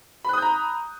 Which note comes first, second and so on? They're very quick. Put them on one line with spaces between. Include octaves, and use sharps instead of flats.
B5 F#6 D#6 G6 A#5